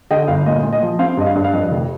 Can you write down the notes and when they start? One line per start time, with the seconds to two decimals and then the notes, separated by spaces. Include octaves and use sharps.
0.10 D3 D#5 G5
0.28 G1 F5
0.46 A#2 D#5
0.63 A#2
0.73 D#5
0.82 F3
0.99 C4 F5
1.17 G2 D#5
1.26 F5
1.35 G2
1.44 F5
1.53 F2 D#5
1.71 F1